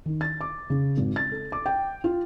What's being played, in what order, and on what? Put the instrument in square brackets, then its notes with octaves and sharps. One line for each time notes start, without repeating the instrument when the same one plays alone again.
[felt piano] D#3
A6
D6
C#3
G#1
A6
A4
D6
G5
F4